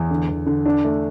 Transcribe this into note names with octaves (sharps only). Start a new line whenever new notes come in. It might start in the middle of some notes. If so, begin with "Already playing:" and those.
Already playing: E2
D3
E2
D3
D4
A3